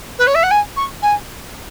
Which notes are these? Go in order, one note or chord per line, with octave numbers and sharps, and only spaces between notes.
B4
C#5
E5
F#5
G#5
C#6
G#5